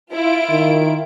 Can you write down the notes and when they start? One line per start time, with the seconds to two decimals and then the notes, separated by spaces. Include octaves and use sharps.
0.11 E4 F4 D7
0.50 D#3